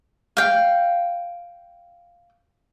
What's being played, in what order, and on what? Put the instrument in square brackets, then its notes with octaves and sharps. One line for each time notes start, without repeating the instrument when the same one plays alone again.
[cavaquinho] F5 G5